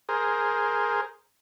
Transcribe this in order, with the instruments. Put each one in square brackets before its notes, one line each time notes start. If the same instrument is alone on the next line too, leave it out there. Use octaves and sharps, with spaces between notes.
[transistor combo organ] G#4 A#4 C5